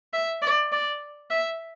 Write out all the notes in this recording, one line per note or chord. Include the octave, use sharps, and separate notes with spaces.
E5
D5
D5
E5